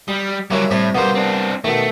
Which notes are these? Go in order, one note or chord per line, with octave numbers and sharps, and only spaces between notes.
G3 D#6
F#3 G3 A#3 C#4 E4
A2 C3 G3 B5
B2 G3 A#3 B3 C5
C4 D4
B2 D#3 A3